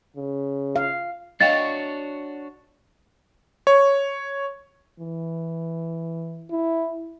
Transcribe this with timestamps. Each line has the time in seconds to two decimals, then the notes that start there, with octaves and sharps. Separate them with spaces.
0.16 C#3
0.76 F5
1.40 D4 F#4 C#5 D#5 F5 G5 A6
3.67 C#5
5.00 E3
6.50 E4